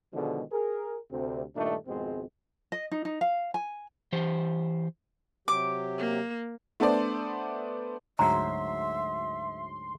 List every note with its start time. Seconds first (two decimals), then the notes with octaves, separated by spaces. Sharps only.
0.14 B2 D3 D#3 F3 G#3
0.51 G#4 A#4
1.10 D2 C3 C4
1.56 G2 A#2 D#3 A3 D4 D#4
1.86 G#1 F2 B2 G#3 C4
2.72 D#5
2.92 D#4
3.05 D#4
3.21 F5
3.54 G#5
4.13 E3 G4 C5
5.48 C3 F#3 G4 D6
5.98 A#3
6.80 A3 B3 D4 A4 C5 D5
8.19 D2 G#2 F#3 E5 A#5 C6